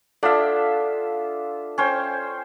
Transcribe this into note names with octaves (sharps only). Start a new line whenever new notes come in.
D4 F4 A4 D5 E5 F#5
C#4 C5 G5